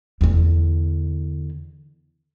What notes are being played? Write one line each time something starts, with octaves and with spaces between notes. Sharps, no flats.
E2 D3